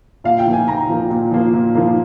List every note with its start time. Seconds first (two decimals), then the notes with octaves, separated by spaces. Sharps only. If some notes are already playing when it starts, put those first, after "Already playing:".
0.24 A#2 F5
0.39 G5
0.46 F3 A#3
0.53 G#5
0.68 A#2 A#5
0.89 F3 A#3
1.10 A#2
1.31 F3 A#3
1.54 A#2
1.75 F3 A#3